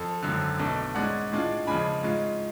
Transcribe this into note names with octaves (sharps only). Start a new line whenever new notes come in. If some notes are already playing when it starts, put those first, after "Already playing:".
Already playing: F2 A4
G#1 F#2 D3
B1 B2 A3 D4
G#2 G#3 C#4 D5 F#5
A2 G#3 D4 F4
F2 C#3 G#3 D4 G#5 B5
G#2 G#3 C#4 F4